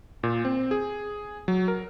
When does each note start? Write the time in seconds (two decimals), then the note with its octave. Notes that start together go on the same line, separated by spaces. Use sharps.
0.23 A#2
0.45 C4
0.71 G#4
1.48 F#3
1.68 A#4